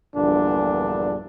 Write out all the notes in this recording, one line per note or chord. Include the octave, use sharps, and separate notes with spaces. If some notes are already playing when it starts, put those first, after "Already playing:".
A#1 E2 G2 A#2 D3 D4